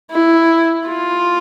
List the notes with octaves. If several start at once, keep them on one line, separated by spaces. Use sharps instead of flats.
E4
F4